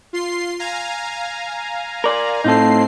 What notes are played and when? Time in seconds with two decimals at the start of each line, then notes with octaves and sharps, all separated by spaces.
0.13 F4 C6 C7
0.59 F5 G#5 A#5
2.04 A#4 D5
2.44 A2 C4 D#4 F4 A4 C7